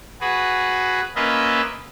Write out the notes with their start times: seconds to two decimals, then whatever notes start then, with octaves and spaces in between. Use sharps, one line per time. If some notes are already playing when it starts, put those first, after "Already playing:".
0.21 F#4 G#4 B4
1.16 A#3 C#4 F4 B4 D#5 E5